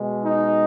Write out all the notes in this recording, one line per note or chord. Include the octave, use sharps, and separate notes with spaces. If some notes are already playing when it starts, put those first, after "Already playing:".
Already playing: B2 G#3
D#4